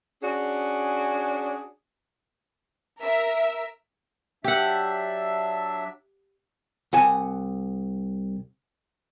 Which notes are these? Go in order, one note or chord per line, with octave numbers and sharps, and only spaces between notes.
C#4 D4 F#4 G#4
A#4 E5
F#3 D4 G4 E5 F#5
C2 F#5 G#5 A5